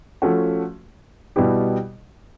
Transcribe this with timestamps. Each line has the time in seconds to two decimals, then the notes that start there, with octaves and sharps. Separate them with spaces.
0.22 F3 A3 C#4 F#4
1.36 B2 G3 B3 E4 G4